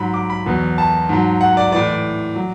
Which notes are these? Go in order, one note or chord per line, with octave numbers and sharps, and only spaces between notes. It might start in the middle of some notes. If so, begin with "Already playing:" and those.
Already playing: G#2 F#3 B5
D6
B5
E2 B2 F#3
A5
G#2 F#3
F#5
D5
A2 E3 D5
D5
F#3